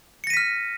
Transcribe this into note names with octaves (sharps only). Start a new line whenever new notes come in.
F6 A#6 B6 C#7 D#7